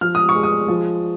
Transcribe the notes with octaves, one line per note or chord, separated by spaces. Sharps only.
F3 F6
D#6
C#6
G#3
D#6
F3